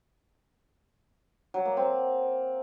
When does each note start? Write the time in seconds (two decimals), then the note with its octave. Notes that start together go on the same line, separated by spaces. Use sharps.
1.54 F#3
1.66 A#3
1.77 C4